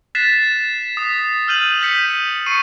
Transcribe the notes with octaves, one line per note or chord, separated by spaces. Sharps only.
F#6 A6 B6 C7 E7
D#6 B6
E6 F6 G6 D#7 F#7
G6 B6 C#7
C#6 D#6 C7 C#7 D#7